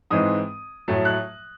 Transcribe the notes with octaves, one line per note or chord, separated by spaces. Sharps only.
G#2 E3 G#3 C4 D#6
A2 F#3 A3
F#6